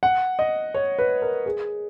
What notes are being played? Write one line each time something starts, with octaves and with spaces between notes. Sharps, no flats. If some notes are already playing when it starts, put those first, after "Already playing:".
F#5
D#5
C#5
B4
A#4
G#4